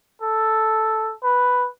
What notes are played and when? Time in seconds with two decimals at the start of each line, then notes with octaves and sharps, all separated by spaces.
0.22 A4
1.23 B4